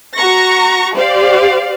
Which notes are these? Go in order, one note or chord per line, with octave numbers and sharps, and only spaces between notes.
F#4 A#5 C#6 A#6
G4 C5 D5 F5